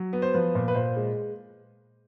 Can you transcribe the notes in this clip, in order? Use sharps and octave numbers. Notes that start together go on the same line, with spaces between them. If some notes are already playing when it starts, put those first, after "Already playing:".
Already playing: F#3
B3
C5
F3 B4
A#2
B4
A#2 C5
G#3